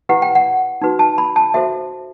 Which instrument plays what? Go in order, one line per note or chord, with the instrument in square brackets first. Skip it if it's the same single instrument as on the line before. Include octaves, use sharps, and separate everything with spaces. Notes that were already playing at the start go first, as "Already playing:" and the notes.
[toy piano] E4 G4 B4 F#5
G5
F#5
D#4 F#4 B4
A5
B5
A5
F#4 A4 C5 E5